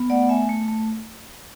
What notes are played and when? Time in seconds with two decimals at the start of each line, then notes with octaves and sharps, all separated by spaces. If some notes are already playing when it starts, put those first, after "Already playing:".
Already playing: B3
0.10 A3 D5 F#5
0.29 A3 E5 G#5
0.49 A3
0.68 A3